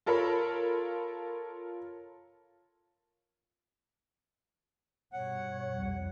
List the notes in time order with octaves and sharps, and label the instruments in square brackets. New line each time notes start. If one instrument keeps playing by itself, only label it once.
[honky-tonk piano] F4 A4 A#4 C#5 B5
[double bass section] G2 B2 [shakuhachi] C#5 [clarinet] F#5
[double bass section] C2 F2 G3